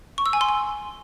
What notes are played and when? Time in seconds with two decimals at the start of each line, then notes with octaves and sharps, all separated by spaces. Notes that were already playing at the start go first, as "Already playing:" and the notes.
0.18 C#6
0.26 E6
0.33 G#5
0.41 C6
0.49 G#5